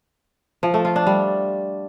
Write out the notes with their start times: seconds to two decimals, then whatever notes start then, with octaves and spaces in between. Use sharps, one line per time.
0.63 F3
0.74 A3
0.85 F4
0.96 D4
1.07 G3